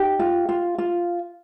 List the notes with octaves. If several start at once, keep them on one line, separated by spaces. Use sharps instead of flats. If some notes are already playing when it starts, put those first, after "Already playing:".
Already playing: D#4 G4
F4
F4
F4